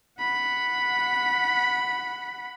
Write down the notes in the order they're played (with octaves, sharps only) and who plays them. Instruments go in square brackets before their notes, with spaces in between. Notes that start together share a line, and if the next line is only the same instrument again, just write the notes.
[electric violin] F#5 B5